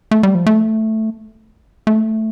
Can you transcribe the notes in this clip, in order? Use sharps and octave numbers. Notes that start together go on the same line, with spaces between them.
A3
G3
F3
A3
A3